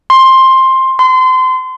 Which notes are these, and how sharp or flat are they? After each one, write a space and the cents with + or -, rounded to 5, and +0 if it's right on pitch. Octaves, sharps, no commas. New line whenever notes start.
C6 +10
C6 -30